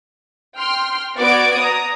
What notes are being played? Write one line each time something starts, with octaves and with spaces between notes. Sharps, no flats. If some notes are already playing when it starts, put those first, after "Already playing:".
G5 C6 F6
B3 F#4 D5 D6 G#6 D7
A#5 D#6